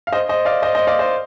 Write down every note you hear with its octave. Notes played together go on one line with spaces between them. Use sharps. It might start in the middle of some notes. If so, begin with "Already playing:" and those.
F5
C5 D#5
C5 D#5
D5 F5
C5 D#5
C5 D#5
D5 F5
C5 D#5